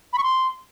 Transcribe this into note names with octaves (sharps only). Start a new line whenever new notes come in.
B5
C#6
C6